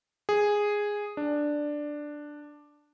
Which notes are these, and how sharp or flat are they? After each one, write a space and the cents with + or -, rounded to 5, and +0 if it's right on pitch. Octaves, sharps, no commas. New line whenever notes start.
G#4 -5
D4 +5